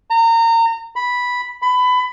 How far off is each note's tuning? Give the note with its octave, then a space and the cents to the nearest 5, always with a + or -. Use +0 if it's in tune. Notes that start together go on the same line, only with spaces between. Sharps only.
A#5 -30
B5 -5
B5 +20